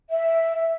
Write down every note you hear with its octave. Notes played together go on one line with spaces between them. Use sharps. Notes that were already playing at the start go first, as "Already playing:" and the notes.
E5